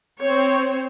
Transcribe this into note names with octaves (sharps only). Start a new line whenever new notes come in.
C4 C5 C#5